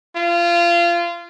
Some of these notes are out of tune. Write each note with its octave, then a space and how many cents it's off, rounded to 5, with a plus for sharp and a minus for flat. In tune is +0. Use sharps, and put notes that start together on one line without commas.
F4 -25